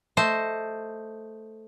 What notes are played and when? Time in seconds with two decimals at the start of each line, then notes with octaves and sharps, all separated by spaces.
0.17 A3 C5 D#5